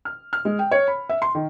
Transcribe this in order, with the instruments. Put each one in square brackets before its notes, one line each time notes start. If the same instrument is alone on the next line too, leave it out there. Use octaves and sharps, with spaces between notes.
[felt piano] F6
F6
G#3
G5
C#5
B5
E5
C6
D#3